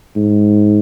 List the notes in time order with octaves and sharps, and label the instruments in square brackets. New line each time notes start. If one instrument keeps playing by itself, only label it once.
[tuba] G#2